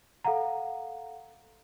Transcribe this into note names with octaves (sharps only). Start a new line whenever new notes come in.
A4 F5 F#5 A#5